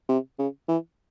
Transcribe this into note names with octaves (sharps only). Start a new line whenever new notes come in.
C3
C#3
E3